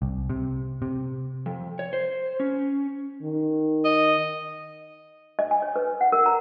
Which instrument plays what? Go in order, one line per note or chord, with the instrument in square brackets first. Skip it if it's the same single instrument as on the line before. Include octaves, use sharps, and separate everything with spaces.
[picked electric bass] C2
C3
C3
[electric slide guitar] F2
C#5
C5
C#4
[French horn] D#3
[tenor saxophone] D#5
[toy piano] D#5
G#5
C#5
B4
F#5
A#4
A#5